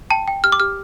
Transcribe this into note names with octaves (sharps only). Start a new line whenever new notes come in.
G5 A5
G5
G4 F6
D6
G4 F6